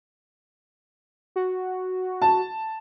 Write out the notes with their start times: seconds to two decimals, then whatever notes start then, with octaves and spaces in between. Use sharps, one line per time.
1.36 F#4
2.22 A5